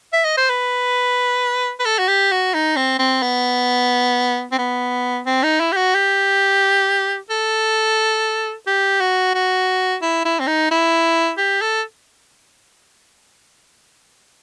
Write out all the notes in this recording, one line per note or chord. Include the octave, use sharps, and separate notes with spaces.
E5
D#5
C5
B4
B4
A4
F#4
G4
F#4
D#4
C4
C4
B3
C4
B3
C4
D#4
E4
G4
F#4
G4
A4
G4
F#4
F#4
E4
E4
C4
D#4
E4
G4
A4